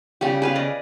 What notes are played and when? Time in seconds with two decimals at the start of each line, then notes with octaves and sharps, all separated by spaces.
0.21 C#3 G3 G4
0.42 G#4 B4 F5
0.55 D5 D#5